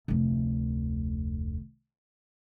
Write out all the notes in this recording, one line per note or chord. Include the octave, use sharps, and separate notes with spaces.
F1 D2